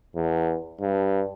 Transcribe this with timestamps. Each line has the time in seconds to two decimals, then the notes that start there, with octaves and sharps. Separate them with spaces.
0.16 E2
0.81 G2